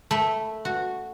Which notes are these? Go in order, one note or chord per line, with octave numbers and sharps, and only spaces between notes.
A3 B5
F#4